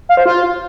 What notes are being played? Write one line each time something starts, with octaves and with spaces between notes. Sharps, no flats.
F5
C5
F4